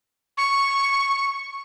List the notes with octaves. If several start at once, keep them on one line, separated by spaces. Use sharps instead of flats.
C#6